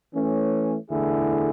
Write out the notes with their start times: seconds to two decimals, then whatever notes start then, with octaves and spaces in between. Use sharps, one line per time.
0.14 E3 A3 C#4
0.90 E2 D3 A3 E4 G#4